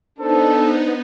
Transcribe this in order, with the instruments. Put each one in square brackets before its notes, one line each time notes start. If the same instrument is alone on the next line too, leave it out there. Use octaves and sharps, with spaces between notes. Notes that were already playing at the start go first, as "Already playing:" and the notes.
[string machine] B3 D#4 [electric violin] D4 [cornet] A4 [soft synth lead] C5